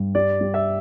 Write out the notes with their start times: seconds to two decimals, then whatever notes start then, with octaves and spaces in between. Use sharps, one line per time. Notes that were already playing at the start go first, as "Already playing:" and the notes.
Already playing: G2
0.15 G3 D5
0.41 G3
0.54 E5